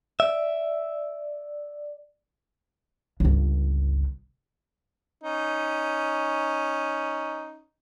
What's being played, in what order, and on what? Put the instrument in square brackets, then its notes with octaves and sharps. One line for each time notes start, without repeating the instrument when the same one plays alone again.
[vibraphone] D5 [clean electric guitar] E5
[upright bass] G1 C#2
[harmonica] C#4 D#4